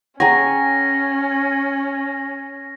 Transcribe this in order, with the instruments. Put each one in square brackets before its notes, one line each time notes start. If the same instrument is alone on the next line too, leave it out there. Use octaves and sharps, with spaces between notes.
[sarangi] C#4 [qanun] G#4 C#5 [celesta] F#5 G5 A#5 [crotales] A#6